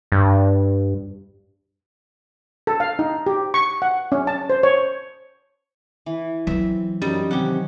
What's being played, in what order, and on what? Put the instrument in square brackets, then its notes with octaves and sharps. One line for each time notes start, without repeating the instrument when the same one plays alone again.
[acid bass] G2
[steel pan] A4
F5
D#4
G4
C#6
F#5
C#4
A5
C5
C#5
[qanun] E3
[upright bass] E3 F#3 [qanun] C4 [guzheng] E5
[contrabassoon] F#2 [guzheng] G3 [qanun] C4 D#4
[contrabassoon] C3 [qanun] D#3 C#4 [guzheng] G4 F#5